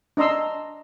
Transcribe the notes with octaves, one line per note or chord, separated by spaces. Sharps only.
D4 D#5 A#5 C6 E6